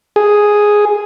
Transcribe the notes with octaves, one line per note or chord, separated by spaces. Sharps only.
G#4